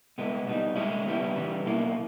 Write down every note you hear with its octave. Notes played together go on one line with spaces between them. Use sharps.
C#2 B2 G#3 B3 E4
B2 G3 B3 D#4
C#2 C#3 G#3 C#4 E4
C#2 B2 G3 B3 E4
C#3 E3 G3
B1 B2 A#3 E4